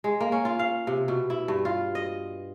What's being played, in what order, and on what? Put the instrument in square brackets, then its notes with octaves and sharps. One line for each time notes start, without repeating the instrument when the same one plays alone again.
[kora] G#3
A#3
C#4
F4
F5
C3
B2
E4
G2
F4
D#5